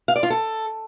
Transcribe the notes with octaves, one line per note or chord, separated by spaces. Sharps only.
F5
D5
F4
A4